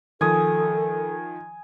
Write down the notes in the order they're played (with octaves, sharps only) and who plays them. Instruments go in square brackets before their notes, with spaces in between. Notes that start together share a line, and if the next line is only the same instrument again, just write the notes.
[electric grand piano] D#3 F3 [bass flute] A4 [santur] G#5 D#6